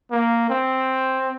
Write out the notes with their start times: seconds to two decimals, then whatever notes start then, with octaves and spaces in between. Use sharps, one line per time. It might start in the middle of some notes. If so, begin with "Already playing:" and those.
0.11 A#3
0.49 C4